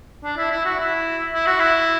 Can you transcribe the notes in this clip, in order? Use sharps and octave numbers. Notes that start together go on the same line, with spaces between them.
D4
E4
E4
F#4
E4
E4
F#4
E4